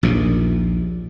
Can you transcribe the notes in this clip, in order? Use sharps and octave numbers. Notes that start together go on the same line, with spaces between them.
A#1 D#2 A#2